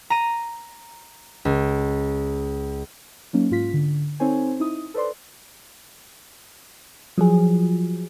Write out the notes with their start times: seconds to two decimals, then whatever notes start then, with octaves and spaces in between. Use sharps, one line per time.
0.10 A#5 D#7
1.45 C#2
3.33 F#3 A#3 C#4 D#4
3.51 G#2 F4 B6
3.74 D3
4.20 C4 D#4 A4 C5 C#5 G#5
4.60 D#4 E4 D#6
4.94 A4 B4 C5 D5 C6
7.18 F3 F#3 G#4